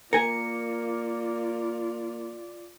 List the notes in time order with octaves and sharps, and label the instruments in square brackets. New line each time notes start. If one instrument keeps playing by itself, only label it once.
[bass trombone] A#3 [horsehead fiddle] F4 D5 [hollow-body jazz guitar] A#4 G#5 [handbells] C#7